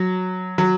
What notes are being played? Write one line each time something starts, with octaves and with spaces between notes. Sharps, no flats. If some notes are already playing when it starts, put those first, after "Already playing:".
Already playing: F#3
F#3